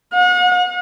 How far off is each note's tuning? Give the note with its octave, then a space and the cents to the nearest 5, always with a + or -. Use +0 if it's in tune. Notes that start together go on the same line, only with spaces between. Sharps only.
F#5 -40